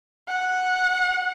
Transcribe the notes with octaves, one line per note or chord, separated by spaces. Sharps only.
F#5